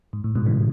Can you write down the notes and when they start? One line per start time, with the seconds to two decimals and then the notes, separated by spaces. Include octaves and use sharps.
0.13 G#2
0.24 A2
0.35 G#2 B2
0.46 C#3 E3